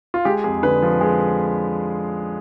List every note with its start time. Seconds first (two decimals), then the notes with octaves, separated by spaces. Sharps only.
0.14 F4
0.25 G#3 G4
0.44 F2 G#4
0.63 D3 B4
0.82 F3
1.01 G#3